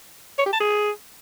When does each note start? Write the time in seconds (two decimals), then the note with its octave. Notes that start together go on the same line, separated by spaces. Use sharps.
0.39 C#5
0.46 G4
0.53 A5
0.60 G#4